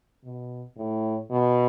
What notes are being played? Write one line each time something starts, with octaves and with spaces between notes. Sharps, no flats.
B2
A2
B2